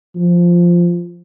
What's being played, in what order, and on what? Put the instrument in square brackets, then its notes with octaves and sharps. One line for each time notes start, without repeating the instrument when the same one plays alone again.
[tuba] F3